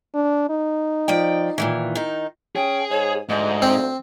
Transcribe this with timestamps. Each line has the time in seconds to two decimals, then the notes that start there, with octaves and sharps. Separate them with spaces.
0.14 D4
0.49 D#4
1.08 F3 D5 G5
1.58 A#2 D#3 E3
1.95 D#3 D#4
2.56 C#4 G#4 G5
2.90 G#2 C#5
3.29 D2 G#2 D#5
3.62 C4